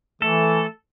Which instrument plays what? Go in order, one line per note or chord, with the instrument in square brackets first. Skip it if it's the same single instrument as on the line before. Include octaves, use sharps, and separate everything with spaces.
[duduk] E3 [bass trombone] A3 [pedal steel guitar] A4